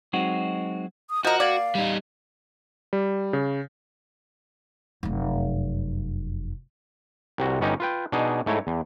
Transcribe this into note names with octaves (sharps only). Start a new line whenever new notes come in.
F#3 G#3 C4 D#4 F#4
D#6
F3 F#4 A#4 D#5
A#3 D5 F5
G3 D#4
G3
C#3
F1 F#2
C2 C3 F#4
G1 B3 C#4 D#4 G4 A#5
F4 B4 G5
B2 D4 D#4 G#4
G#2 A3 E4 C#5 A#5
E2